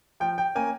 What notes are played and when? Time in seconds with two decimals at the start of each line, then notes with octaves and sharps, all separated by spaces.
0.20 F3 G5
0.38 G5
0.55 A#3 C#4 G#5